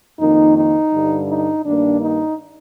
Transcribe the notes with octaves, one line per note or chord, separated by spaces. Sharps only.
F2 D#3 A#3 D#4
D#4
G2 D3 G3
D#4
G2 D#3 A#3 D4
D#4